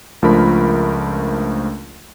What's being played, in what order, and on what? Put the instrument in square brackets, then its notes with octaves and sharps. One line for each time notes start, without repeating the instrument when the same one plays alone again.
[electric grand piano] C#2 F3 A3 D4 A#4 B5